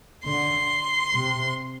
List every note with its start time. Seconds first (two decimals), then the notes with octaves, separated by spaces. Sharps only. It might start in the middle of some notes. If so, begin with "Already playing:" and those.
0.25 D3 C6
1.13 C3